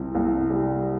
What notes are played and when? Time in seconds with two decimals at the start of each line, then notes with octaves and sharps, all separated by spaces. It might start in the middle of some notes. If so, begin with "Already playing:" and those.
Already playing: C2 C3
0.15 C2
0.50 G3